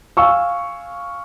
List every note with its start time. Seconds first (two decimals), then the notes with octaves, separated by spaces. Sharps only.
0.17 F5 G#5 C#6 E6